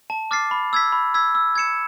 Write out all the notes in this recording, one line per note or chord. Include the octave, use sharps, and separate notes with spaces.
A5
D6 F6 A6 C7
B5
E6 G#6 B6
B5
E6 G#6 B6
E6
G#6 C#7 E7